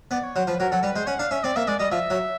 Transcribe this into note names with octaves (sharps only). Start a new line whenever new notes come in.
B3 D5
C#5
F#3 C5
F3 B4
F#3 A#4
F#3 A4
G3 B4
G#3 C5
C#4 F#5
D4 F5
C#4 E5
C4 D5
A#3 E5
G#3 D5
G3 D#5
F3 E5
F#3